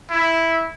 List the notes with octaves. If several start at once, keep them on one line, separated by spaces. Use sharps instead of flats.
E4